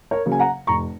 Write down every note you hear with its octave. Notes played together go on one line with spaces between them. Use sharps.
A#4 C#5
C#3 F#3 A#3
G#5
F#5 A#5
F1 A#5 C#6